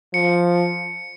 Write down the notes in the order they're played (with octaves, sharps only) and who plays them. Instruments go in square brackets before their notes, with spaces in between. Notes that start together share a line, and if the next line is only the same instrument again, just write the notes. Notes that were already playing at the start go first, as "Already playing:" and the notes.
[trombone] F3 [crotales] C#7